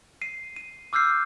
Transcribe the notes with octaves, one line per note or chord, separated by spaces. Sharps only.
C7 D#7
D#7
D6 E6 F6 G6 C7